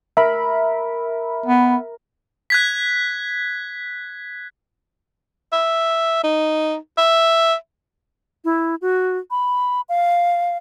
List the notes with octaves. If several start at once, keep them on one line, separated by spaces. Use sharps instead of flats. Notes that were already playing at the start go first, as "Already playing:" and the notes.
A#4 E5 B5
B3
F#6 G#6 B6
E5
D#4
E5
E4
F#4
B5
F5